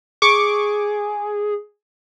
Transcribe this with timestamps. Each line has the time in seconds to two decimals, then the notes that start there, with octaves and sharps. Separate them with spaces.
0.22 G#4 C#6 D6